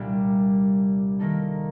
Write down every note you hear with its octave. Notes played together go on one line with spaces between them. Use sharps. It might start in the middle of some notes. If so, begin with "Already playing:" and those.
Already playing: C2 A#2 G3 A#3 D4
D#3 A#3 D#4 A4